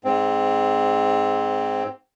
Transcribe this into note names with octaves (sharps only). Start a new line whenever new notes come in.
G#2 C4